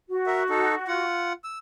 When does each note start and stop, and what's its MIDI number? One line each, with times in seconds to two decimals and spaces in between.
0.09 1.04 66
0.27 0.43 70
0.27 0.43 76
0.49 0.75 63
0.49 0.75 69
0.88 1.33 65
0.88 1.33 78
1.44 1.58 88